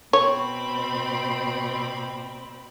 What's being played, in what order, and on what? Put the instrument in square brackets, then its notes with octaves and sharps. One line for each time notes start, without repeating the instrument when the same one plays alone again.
[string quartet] B2 C4 B5 [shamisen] C#5